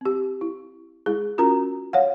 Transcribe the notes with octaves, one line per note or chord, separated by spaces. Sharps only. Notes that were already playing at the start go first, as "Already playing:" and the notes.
C4 G4
E4
G#3 E4 G#4
C#4 F4 F#4 A#4 A#5
C#5 F5 F#5